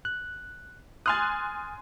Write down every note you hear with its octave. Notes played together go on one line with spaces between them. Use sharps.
F#6
G#5 C6 D#6 F6 F#6 A6